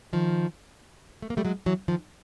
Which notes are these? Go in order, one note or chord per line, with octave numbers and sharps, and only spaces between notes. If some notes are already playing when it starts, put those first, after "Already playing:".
D#3 F3
A3
A#3
G3 A3
F#3 G#3
E3 F#3
D#3 F3